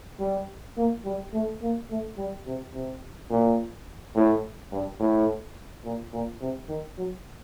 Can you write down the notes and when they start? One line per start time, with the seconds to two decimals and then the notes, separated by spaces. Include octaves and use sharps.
0.20 G3
0.77 A#3
1.05 G3
1.34 A3
1.62 A#3
1.90 A3
2.17 G3
2.46 C3
2.74 C3
3.30 A#2
4.15 A2
4.72 G2
5.00 A2
5.84 A#2
6.13 A#2
6.41 C3
6.69 D#3
6.98 F#3